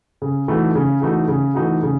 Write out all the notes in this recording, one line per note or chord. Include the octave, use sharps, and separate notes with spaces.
C#3
E3 A3 D#4 F#4
C#3
E3 A3 D#4 F#4
C#3
E3 A3 D#4 F#4
C#3